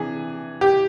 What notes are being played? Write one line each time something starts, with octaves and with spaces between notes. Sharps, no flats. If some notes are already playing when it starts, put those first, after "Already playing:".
Already playing: C3 E3 D4 G#4
G4